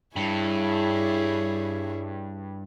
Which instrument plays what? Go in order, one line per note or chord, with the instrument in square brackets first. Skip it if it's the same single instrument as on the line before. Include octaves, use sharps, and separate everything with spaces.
[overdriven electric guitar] G2 [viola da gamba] E4 G#4 C#5